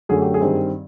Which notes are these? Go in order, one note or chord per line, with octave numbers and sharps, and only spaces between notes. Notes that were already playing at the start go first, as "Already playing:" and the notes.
F#2 D3 F#3 A3 G#4
G4
G#4
G2 D#3 G3 C4